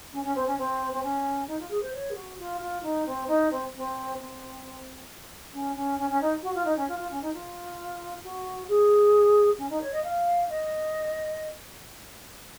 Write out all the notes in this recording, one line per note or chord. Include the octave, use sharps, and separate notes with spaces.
C#4
C#4
C4
C#4
C4
C4
C#4
D#4
F4
G#4
C5
C#5
G#4
F#4
F4
F4
D#4
C4
D#4
C4
C4
C4
C#4
C#4
C#4
C#4
D#4
F#4
F4
D#4
C#4
F4
F4
C#4
D#4
F4
F#4
G#4
C#4
D#4
C#5
D#5
F5
D#5